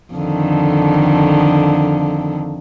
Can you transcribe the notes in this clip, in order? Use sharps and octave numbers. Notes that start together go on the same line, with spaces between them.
F2 D3 D#3